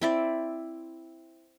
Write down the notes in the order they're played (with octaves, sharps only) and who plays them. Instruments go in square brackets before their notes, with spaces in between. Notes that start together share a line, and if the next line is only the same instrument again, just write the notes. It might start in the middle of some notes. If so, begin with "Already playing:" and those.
[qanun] C4 E4 D5